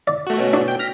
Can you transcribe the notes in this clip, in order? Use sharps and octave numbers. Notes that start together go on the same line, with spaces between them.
D5
A3 F#4
B2 C#4
D4
G5
F6 A#6 B6